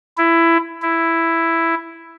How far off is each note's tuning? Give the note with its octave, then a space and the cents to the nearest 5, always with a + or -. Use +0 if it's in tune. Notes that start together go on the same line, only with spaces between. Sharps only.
E4 +15
E4 +5